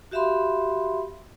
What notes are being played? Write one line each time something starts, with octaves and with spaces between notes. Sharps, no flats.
F#4 G4 E5 F5 B5 C6